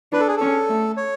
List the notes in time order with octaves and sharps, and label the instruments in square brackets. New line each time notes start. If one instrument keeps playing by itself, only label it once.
[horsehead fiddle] D4 [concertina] B4
[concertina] A4
G#4
[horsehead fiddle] C#4 [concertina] A4
[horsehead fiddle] A3
[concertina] C#5